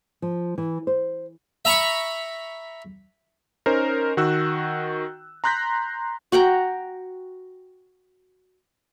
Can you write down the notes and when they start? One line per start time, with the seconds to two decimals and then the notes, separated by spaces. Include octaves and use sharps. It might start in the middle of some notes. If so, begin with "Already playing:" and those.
0.22 F3
0.58 E3
0.87 C5
1.65 E5 A#5 B5 C#6
3.66 C#4 D#4 A#4 C5
4.17 D#3 F#4 E6 F#6
5.44 A#5 C6 F#6 G6 A#6 B6
6.32 F#4 F#5 G5 A#5